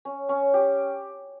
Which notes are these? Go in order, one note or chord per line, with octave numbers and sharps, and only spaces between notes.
C#4
C#4
G4